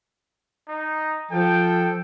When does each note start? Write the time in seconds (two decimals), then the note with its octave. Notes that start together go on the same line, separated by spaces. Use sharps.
0.68 D#4
1.31 F3 A4 G5